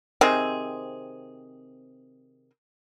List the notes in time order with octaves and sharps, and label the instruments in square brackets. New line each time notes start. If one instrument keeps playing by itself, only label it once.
[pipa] C3 D#3 C4 G#4